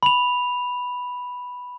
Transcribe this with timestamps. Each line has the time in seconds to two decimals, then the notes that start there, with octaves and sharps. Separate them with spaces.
0.03 B5 F7